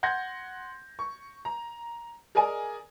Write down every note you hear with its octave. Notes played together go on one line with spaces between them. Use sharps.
F#5 C6 G6 G#6 A#6
C#6
A#5
G#4 A#4 D5 D#5 G#5